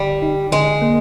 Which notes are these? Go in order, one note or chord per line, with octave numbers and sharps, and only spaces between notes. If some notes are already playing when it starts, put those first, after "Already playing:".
Already playing: D3 G3
D#4
D3 G#3
A#3